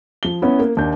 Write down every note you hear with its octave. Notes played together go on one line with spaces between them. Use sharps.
F3 G7
B3 C#4 E4
A#3
D#2 D4 G6